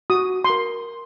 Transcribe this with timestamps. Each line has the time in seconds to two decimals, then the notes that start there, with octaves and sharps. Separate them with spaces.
0.10 F#4 D#6
0.45 C6
0.50 A#4